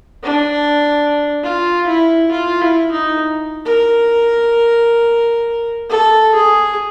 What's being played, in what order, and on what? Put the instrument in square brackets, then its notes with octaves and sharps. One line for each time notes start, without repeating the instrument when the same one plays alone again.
[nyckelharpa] D4
F4
E4
F4
E4
D#4
A#4
A4
G#4